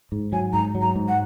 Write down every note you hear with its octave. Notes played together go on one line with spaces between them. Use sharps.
G#2
F#3 G#5
G#2 A#5
F#3
A#5
G#2
F#5